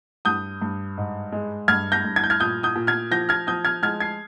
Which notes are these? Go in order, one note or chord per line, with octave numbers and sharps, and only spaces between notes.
G2 D#6 G6
G2
G#2
G#3
G2 F6 G#6
G6 A#6
G2
G#6
G6
F6 G#6
A#2 D#6 G6
D#6 G6
A#2
F6 G#6
F3 G6 A#6
F6 G#6
F3 D#6 G6
F6 G#6
G#3 F6 G#6
G#6 C7